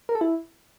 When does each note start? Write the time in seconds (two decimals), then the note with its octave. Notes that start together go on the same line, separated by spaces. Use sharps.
0.09 A#4
0.15 A4
0.21 E4